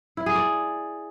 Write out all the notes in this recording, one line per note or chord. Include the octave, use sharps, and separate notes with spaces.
E4
G#4
D5